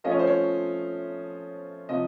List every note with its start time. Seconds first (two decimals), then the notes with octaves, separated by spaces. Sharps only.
0.04 F3 A3 C#4 F4 D#5
0.11 C#5
0.19 C5
0.27 C#5
1.89 C3 F3 D#5